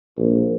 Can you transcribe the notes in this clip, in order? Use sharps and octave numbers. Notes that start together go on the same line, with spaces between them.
A#1